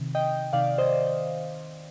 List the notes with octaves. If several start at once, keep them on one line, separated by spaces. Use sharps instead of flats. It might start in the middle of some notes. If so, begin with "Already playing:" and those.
Already playing: C3 D#3
D#5 G5
C3 D#3 D5 F5
C5 D#5